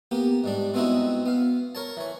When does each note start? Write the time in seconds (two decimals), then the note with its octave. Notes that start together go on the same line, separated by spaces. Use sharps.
0.11 A#3 B3 G4
0.44 G#2 G3 D4
0.74 G#3 B3 C4 D#4 E4 F#4
1.26 B3 F5
1.75 A#4 C#5 A5
1.97 E3 C#5